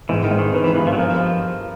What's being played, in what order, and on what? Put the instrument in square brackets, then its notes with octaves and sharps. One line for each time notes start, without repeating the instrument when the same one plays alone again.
[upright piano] G#2 [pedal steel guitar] E3
[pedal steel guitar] D#3
[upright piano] G#2
[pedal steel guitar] D#3
[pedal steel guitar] D#3 [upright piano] B3
[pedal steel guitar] E3
[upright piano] G2 [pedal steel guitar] E3
[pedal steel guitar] F3
F#3
[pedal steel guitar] F3 [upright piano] A#4